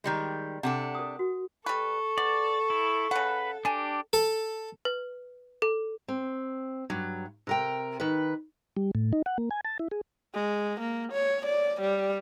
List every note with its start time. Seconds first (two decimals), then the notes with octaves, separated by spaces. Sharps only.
0.04 D#3 G3 G#3
0.63 C3 D4 A4 F#5
0.95 A#4 D#6
1.19 F#4
1.66 G3 A4 B4 C#6
2.18 B3 D5
2.70 E4
3.11 C#3 B4 F#5
3.65 D4 G4 G#5 A5
4.13 A4
4.85 B4
5.62 A4
6.08 C4
6.90 G2 F#3
7.47 C3 A#4 G5
8.00 D#3 B4
8.77 G3
8.95 A2
9.13 D#4
9.26 F#5
9.38 A#3
9.51 G#5
9.65 A5
9.79 E4
9.91 G#4
10.34 G#3
10.80 A#3
11.12 C#5
11.45 D5
11.81 G3